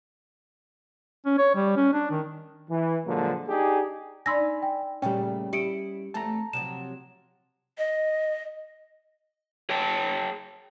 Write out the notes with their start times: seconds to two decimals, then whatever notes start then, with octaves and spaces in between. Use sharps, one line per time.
1.26 C#4
1.38 C#5
1.55 G3
1.77 C#4
1.93 D4
2.11 D#3
2.69 E3
3.06 A#2 D3 F3 F#3 G#3 A#3
3.48 D4 D#4 G4 G#4
4.26 D4 D#4 G#5 B5 C6 E6 A#6
4.62 G5
5.02 A#2 C#3 G3 A3 C#4 G5
5.53 E4 G4 D#5 C#7 D7
6.14 E2 A3 C4 A5 A#5
6.53 C3 F3 F#3 E7
7.78 D#5
9.69 G#4 C#5 G5 A5